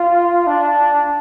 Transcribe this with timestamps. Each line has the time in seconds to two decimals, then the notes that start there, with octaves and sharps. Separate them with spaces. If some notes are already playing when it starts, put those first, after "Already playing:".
Already playing: F4
0.47 D4